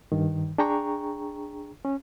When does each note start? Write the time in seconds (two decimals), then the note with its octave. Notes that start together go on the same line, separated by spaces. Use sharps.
0.12 G2 D#3
0.58 D4 G#4 G5 A#5 C#6
1.85 C#4